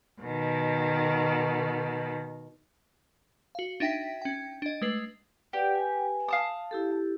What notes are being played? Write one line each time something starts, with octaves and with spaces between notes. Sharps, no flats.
B2 D#3
F#4 F5
D4 D#4 E5 G5 A#6 B6
C#4 G5
D4 D#5
G#3 A3 B4 C7 F#7
G4 B4 D5 F#5
B4 G#5
F5 A5 D#6
E4 G4 A4